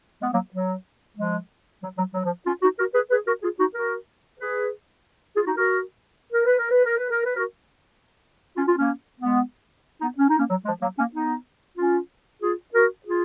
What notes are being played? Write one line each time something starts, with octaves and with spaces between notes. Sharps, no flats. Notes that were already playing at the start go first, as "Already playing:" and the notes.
G#3 B3
F#3 A#3
F#3
F3 G#3
F#3
F#3
F#3
F3
C#4 F4
D#4 F#4
F#4 A#4
G#4 B4
G#4 B4
F#4 A#4
F4 G#4
D#4 F#4
F#4 A#4
G#4 B4
F4 G#4
D#4 F#4
F#4 A#4
A#4
B4
A#4
B4
A#4
B4
A#4
B4
F#4 A#4
C#4 F4
C#4 F4
A#3 C#4
G#3 B3
B3 D#4
C#4
D#4
A#3 C#4
F#3
F3 G#3
F#3 A#3
A#3 C#4
B3 D#4
C#4 F4
F4 G#4
F#4 A#4
F4 G#4